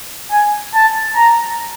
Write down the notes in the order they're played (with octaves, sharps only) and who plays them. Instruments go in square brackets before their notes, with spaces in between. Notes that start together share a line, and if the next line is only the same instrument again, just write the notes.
[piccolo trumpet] G#5
A5
A#5